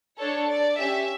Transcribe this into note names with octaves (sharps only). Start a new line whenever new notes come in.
D4 A4 C#5
D5
C#4 G4 E5